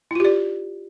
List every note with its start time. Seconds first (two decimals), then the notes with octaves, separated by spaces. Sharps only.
0.11 E4
0.15 F4
0.20 G4
0.25 D5